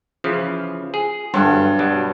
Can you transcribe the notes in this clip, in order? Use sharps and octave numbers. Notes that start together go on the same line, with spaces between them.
C#3 E3 F3
G#4
G1 G2 F#3
B2 F#3 G3